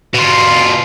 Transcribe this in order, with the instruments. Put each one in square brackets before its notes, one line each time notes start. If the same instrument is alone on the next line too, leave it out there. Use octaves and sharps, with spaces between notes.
[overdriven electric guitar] B2 F4